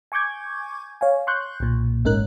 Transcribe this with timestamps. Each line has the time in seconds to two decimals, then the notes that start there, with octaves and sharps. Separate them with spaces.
0.12 G#5 C#6 D6 G6 G#6
1.01 C#5 F5 G#5
1.27 C6 C#6 F#6 G6
1.60 B1 A#2
2.05 G1 G#2 C#4 D#4 A#4 F#6